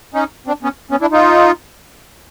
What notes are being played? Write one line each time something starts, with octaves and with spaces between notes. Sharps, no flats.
C#4 D#4
C4 D4
B3 C#4
B3 C#4
D4 E4
D#4 F4